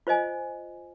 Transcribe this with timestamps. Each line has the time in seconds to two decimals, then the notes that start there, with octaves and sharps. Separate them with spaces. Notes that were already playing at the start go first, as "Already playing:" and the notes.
0.07 F4 C5 D#5 G#5